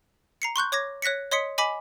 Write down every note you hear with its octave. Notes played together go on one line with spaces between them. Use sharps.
A#5 C7 C#7
C6 C#6 F#6 G6
C#5 D6 G#6 A#6
C#5 F#6 A#6 B6 C#7
C#5 D#5 C6 D#6 B6 C#7
D#5 G#5 B5 D6 B6